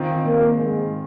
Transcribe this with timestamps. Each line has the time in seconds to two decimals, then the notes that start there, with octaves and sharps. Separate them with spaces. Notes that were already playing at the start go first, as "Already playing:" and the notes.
Already playing: D#3 C4 F4
0.23 A#2 A#3
0.55 G#2 G#3